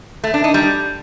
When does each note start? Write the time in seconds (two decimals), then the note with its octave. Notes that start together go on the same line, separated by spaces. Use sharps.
0.24 A3
0.34 D4
0.44 D#4
0.54 G3